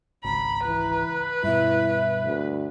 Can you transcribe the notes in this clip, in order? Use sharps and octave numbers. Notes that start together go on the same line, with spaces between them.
G#1 C#2 A#5 B5
E3 B4
G2 B2 E4 E5
D2